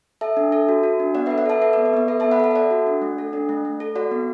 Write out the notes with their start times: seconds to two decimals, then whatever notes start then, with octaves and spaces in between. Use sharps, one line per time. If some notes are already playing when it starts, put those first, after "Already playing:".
0.21 A4 E5 A5
0.37 D4
0.52 A4
0.69 F#4
0.83 F#4
1.00 D4
1.15 B3 D5 F#5
1.26 A4 B4 E5
1.38 D5 F#5
1.46 A4 E5 A5
1.61 A4 B4 E5
1.73 B3 D5
1.85 B4
1.93 B3 D5
2.08 A4 B4 E5
2.20 B3 E5 A5
2.31 F#5 B5
2.40 A4 E5 A5
2.51 E5
2.55 A4 D5 F#5
2.71 F#4
2.87 D4
3.02 A3
3.18 A4
3.33 D4
3.49 A3
3.65 A3
3.80 A4
3.95 F#4 D5 F#5
4.11 B3